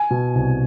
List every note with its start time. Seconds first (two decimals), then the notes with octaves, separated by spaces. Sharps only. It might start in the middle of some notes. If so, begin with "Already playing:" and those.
Already playing: G#5
0.11 B2
0.35 C2